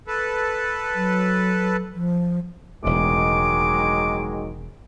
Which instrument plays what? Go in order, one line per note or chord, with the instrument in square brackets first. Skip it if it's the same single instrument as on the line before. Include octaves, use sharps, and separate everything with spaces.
[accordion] A4 B4
[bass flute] F#3
F3
[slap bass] E1 A2 [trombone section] D#3 F#3 G#3 [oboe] D6